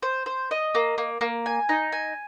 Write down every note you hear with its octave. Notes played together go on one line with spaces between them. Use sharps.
C5
C5
D#5
A#3
A#3
A#3
G#5
D#4
G#5